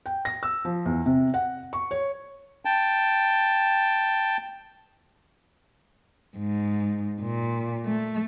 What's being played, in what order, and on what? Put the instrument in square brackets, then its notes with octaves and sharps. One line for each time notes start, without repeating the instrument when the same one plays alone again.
[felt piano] G5
A#6
E6
F3
E2
C3
F#5
C#6
C#5
[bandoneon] G5 A5
[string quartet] G#2
A#2
A3